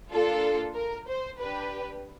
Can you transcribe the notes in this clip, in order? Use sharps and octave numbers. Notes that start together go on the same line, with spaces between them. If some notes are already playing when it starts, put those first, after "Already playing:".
A#3 D4 F4 A4
A#4
C5
D4 G4 B4